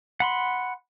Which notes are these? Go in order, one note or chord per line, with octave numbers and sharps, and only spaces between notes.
F#5 B5 C6